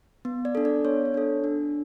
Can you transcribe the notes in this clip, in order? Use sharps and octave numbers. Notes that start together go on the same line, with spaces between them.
B3
D5
D4 A4
D5
B3 C#5
C#5
D4 A4
D4